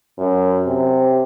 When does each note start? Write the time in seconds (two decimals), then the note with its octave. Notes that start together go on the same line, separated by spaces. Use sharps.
0.18 F#2
0.65 C3